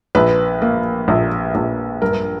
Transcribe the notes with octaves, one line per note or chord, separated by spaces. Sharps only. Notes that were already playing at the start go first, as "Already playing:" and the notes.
A#1 B4
A#3
A#1
A#1
G2 A#4